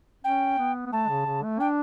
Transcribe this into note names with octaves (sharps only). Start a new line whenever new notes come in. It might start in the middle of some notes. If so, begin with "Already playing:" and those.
C#4 G5
B3
B3
A3 A5
C#3
C#3
A3
D4 G5